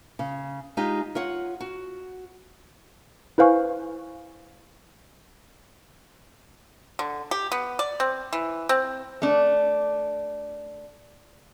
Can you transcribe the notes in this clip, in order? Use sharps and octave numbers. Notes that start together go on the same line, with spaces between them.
C#3
G#3 D#4 F4 G4
F4 C#5 F#5
F#4
E4 B4 C5 F5 G#5 C#6
D3
G4
B3
D5
C4
E3
C4
A3 D4